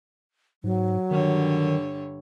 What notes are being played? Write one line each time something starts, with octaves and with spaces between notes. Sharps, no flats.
G#2 F#3
G2 D3 D#3 C#5